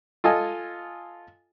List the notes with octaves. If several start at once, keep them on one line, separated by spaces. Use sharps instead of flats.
F4 A4 D#5 G#5